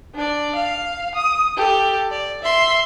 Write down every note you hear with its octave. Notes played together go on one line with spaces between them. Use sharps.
D4 D5
F5
D#6
G4 A4
D5
E5 C6